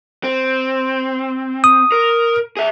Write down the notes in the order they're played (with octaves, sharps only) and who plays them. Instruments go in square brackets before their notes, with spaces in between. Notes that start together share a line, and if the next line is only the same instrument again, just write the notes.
[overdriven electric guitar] C4
[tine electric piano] D#6
[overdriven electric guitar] A#4
G#4 E5